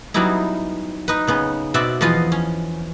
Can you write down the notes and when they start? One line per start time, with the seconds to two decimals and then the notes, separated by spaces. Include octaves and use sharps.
0.14 F#3 G3 B3 C#4 D#4 E4
1.08 D#4 B4
1.27 C#3 B3 C#4
1.74 B2 C4 F#4 D5 E5 B5
2.01 E2 F3 B3 F4 D#5 G#5
2.32 C#4